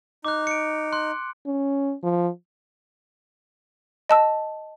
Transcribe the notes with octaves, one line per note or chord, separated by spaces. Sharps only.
D#4 D6 F#6
C#7 D7
C6 F#6
C#4
F3
D#5 A5 E6